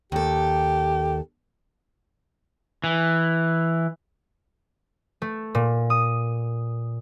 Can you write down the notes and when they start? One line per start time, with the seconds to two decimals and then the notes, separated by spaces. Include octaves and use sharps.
0.12 D#2 G4 A4
2.84 E3
5.22 A3
5.55 A#2
5.90 D#6